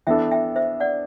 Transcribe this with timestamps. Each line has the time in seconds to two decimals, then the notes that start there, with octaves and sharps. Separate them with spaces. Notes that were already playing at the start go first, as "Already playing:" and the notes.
0.07 E3 B3 D4 A4 E5 G5
0.31 E5 G5
0.56 C5 E5
0.80 D5 F#5